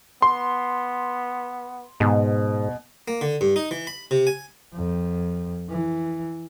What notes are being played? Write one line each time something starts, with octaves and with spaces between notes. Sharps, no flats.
B3 C6
G#2 B2
A#3
D3
G2
D#4
E3
B5
C3
G#5
F2
E3